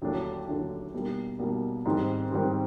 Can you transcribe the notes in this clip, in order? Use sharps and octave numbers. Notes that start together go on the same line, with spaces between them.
D#2 D3 F#3 A3 D4
D#2 D3 F#3 A3 D4
B1 B2 G3 A#3
B1 B2 G3 A#3
G#2 D#3 G3 C4
G#2 D#3 G3 C4